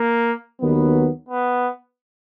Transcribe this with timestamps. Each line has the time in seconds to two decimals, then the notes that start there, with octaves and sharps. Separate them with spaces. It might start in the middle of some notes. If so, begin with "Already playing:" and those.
Already playing: A#3
0.60 D#2 D#3 F#3 B3
1.29 B3